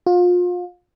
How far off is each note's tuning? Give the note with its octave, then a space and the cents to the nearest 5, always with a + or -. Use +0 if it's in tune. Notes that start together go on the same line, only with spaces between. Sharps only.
F4 +30